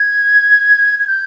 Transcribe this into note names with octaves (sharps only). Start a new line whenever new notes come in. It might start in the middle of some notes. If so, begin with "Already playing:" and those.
Already playing: G#6
G#6
G6